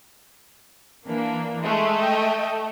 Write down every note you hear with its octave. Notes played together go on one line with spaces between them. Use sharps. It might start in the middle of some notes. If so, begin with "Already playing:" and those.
E3 A#3 D4
G#3 A3
D#5 G5